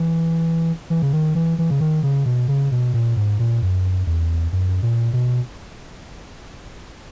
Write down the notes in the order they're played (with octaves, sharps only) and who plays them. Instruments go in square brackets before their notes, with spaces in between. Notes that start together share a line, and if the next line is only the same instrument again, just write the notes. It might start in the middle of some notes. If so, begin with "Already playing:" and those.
Already playing: [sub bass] E3
E3
C#3
D#3
E3
E3
C#3
D#3
C#3
B2
C#3
B2
A#2
G#2
A#2
F#2
E2
F#2
A#2
B2